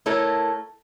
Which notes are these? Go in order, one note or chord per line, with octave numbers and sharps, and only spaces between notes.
A3 E4 A4 A#4 C#5